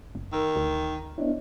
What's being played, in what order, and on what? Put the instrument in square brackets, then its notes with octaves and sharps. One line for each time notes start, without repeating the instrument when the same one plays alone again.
[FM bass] F#1
[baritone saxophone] D#3 [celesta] A#4 E6
[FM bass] D2
[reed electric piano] B3 D4 E4 [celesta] C#5 D#5